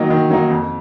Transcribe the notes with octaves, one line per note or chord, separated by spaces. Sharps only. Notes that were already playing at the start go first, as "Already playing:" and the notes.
Already playing: D#3 F#3 A#3 D#4
D#3
F#3 A#3 D#4
F2